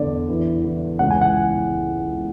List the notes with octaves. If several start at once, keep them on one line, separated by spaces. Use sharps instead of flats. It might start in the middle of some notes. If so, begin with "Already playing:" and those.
Already playing: E2 D3 D5
E3
E3
C#2 F#5
G#5
F#5